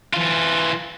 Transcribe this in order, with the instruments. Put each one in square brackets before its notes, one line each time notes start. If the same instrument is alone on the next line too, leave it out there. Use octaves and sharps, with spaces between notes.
[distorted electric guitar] E3 F4